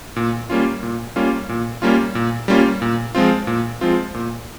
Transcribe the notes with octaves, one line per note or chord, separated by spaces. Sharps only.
A#2
G3 A#3 C#4 F4
A#2
G3 A#3 C#4 F4
A#2
G3 A#3 C#4 F4
A#2
G3 A#3 C#4 F4
A#2
F3 G#3 C4 F4
A#2
F3 G#3 C4 F4
A#2